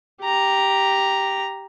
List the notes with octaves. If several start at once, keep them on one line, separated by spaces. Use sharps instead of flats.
G4 A#5